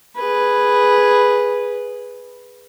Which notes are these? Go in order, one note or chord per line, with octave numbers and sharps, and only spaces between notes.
G#4 B4